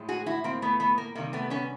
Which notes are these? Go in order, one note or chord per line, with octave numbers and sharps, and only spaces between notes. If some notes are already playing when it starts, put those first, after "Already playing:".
Already playing: A2 F3 G#3
F#4 G#4
E4 F#4
A#3 C4
A3 B3
A3 B3
A#3
C3 D#3 G3 A#3
A3 B3
B3 C#4